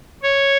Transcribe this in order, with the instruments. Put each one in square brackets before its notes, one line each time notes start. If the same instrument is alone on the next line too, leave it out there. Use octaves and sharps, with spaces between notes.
[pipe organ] C#5